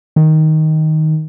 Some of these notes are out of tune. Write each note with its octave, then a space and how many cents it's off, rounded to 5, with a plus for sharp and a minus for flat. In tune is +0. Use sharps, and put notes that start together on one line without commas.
D#3 +5